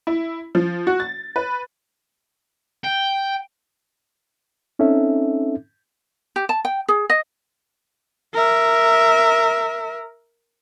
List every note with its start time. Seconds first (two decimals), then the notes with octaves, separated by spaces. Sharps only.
0.07 E4
0.55 F3
0.87 F#4
1.00 A6
1.36 B4
2.84 G5
4.79 C4 C#4 D#4 A4 E5
6.36 G4
6.49 A5
6.65 G5
6.88 G#4
7.10 D#5
8.34 A#4 E5